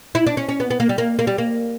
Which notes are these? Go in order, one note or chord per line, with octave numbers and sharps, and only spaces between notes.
E4
D4
C#4
C#4
B3
B3
A#3
G3
A#3
A#3
G3
A#3